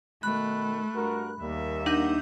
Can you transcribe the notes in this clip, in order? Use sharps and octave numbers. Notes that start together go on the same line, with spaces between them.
B2 D#3 A3 B5 F#6
G2 F#4 A#4
D#2 G3 A#3 E5
D4 D#4 F#5 G6